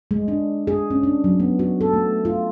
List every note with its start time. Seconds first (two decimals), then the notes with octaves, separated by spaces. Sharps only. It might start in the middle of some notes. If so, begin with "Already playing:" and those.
0.11 G#3
0.28 D4
0.67 G#4
0.91 C#4
1.03 D4
1.24 F#3
1.40 B3
1.59 F#4
1.81 A4
1.93 A3
2.25 F4